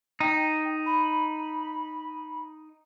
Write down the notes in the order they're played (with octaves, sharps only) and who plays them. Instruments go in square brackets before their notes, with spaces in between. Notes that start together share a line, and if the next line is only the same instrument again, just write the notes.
[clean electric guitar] D#4 [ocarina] G5
[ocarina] B5